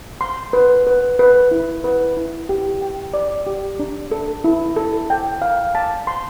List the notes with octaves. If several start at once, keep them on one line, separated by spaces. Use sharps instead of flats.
C6
B4
B4
B4
E4
B4
E4
G4
G5
D5
G4
D4
A4
E4
A4
G5
F5
A5
C6